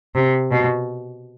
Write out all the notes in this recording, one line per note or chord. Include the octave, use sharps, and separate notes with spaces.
C3
B2